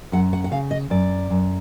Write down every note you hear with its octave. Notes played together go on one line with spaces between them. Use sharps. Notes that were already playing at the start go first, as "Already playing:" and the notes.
F#2 F#5
F#5
F#5
C#3 F5
D#5
F#2 D5
F#2